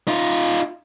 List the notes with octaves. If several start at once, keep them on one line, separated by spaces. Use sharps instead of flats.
D#4 F4